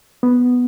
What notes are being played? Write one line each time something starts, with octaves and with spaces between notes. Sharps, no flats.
B3